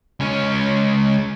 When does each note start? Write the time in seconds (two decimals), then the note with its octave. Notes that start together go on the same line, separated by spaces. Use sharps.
0.20 C#2 C#4